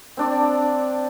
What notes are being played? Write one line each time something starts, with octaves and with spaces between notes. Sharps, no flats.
C4 D4 D5